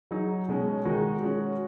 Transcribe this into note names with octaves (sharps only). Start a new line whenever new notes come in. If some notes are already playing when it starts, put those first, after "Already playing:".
F#3 D#4 G#4
B2 G#3 C#4
D#3 G#3 D#4 F#4
G#3 C#4 F#4